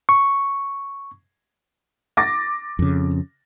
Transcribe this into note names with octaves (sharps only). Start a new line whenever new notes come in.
C#6
D6 A6 A#6
F2 C#3